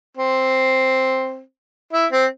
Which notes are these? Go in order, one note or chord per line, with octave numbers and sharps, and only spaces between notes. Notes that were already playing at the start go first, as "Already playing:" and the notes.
C4
E4
C4